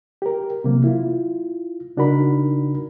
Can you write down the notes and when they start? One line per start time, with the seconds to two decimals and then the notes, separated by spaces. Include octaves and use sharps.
0.22 G4 A#4
0.64 C3 E3 F#3 A#3
0.84 E4 F4
1.97 C#3 D4 D#4 F#4 A#4 B5